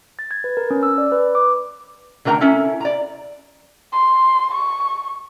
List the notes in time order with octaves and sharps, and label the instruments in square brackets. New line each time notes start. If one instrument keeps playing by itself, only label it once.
[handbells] A6
G#6
B4
A#4
C#4
E6
D5
B4
D6
[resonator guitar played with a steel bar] D3 A3 A#4 F#5 A#5
C#4 E4 A4
D5 A#5
[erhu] C6
C#6